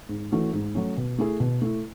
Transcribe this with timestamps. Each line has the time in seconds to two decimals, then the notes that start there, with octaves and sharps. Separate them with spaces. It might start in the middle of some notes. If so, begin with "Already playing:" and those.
0.09 G#2
0.32 E3 A3 C#4 F#4
0.53 G#2
0.75 F#3 A3 C#4
0.97 B2
1.18 A3 E4 G#4
1.40 B2
1.62 A3 E4